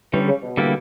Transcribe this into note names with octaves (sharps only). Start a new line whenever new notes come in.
D3 E3 G3 C#4
C#3
B2
D3 G3 A#3 E4 G4